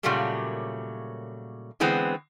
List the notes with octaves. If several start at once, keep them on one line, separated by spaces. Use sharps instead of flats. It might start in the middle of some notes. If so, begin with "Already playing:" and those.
A#2 C#3 F#3 G3 A3 A#3
D3 E3 G#3 B3 C4